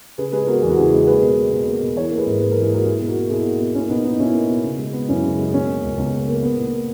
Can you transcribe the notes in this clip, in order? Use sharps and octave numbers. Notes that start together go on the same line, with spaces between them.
C#3 G#4 B4
G#3 G#4 B4
B3 F#4 A#4
E2 G#4
F#4
C#3 E4 G#4
G#3
A#3 G#4 B4
B2
A#3
B2
A#3
B2
E3 A#4 C#5
A#3
G#4 B4
G#2
G#2 B4
E3 A#4
G#4
A#3 F#4 A#4
A#3 E4 G#4
B2
F#4 A#4
A#3
B2 E4 G#4
A#3
B2
A#3 C#4 E4
B2 B3 D#4
A#3 B3 D#4
B2 C#4 E4
A#3
B2
C#3
G#3
B3
F#2 C#4 E4
C#3
G#3
B2 C#4
A#3
C#2
C#2 B3
B2
A#3
A#3 B3
A#2
A#3